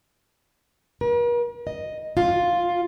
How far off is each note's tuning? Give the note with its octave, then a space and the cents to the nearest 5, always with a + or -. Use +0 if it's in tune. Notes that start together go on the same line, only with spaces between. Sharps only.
A#4 +45
D#5 +0
F4 +5